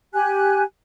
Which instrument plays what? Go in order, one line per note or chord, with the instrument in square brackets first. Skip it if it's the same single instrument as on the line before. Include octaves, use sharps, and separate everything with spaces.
[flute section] G4 G#5 F#6